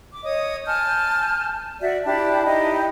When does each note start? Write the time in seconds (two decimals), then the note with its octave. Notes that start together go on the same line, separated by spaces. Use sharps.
0.12 D6
0.25 C#5 D#5 D#6
0.65 G#5 A5 F6 G6
1.81 F#4 D5 E5
2.05 D4 E4 G4 A5
2.45 D#4 E4 G4 D#5